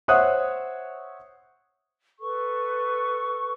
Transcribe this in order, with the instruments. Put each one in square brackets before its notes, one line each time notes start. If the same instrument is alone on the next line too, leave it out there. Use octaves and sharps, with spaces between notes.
[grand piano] C5 C#5 E5 F#5 D#6 F#6
[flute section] A4 B4 C#6